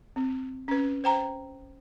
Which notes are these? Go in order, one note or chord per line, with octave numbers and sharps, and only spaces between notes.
C4
C#4 B4
C5 G5 A#5